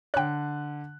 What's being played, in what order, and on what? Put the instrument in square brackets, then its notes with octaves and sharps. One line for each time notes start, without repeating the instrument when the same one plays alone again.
[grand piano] D3 F#6 [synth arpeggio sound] C#5 G5